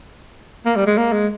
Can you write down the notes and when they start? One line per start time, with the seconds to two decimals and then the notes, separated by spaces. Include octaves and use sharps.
0.66 A#3
0.76 G3
0.87 G#3
0.98 A#3
1.13 G#3